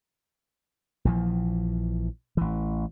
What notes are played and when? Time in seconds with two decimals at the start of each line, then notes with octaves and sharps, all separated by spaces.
1.05 A#1 E3 F3
2.37 A1 E3